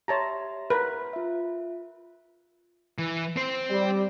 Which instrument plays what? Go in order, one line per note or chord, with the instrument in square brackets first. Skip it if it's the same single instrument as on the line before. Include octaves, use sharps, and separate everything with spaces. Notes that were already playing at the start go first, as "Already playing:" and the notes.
[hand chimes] G4 E5 C6 [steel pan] C#5 A5 A#5
[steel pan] A#4 B4
[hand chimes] F4 E5
[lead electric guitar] E3
C4 C5
[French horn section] G3